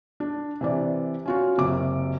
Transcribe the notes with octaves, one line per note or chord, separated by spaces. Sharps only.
D4
C3 E3 D5
C#4 F4 F#4
F#1 C3 D6